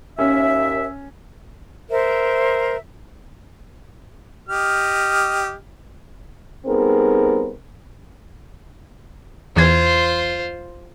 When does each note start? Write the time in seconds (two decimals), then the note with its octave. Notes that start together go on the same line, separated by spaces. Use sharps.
0.19 D#2 C#4 E5
1.90 A#4 C5 E5
4.49 G4 D#5 F6
6.66 G3 B3 C4 D#4 G#4 A#4
9.56 E2 E3 F4 C5 G#6